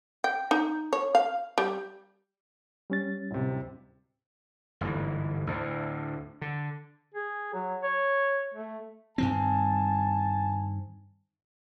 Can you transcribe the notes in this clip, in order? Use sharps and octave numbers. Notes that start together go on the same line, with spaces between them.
G5
D#4
C#5
F5
G3
G3 C#4 A6
D1 C3
G1 D2 G#2 E3
D2 A2
D3
G#4
F#3
C#5
A3
G2 D#3 C4 G#5 A5